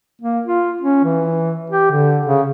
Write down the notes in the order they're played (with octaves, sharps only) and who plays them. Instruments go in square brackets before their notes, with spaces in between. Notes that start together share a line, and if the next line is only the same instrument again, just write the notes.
[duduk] A#3
F4
C#4
E3
G4
D3
C#3